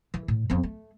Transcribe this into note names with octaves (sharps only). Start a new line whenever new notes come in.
E3
A2
F2 C4
A3